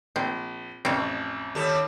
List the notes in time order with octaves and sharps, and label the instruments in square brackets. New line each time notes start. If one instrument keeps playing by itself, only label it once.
[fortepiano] A#1 [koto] C4
[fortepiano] A1 F2 [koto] C4 C#4
[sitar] D#2 G3 A4